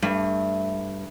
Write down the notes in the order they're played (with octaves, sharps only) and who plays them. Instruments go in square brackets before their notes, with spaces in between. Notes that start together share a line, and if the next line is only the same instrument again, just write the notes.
[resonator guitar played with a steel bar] G2 [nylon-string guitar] A3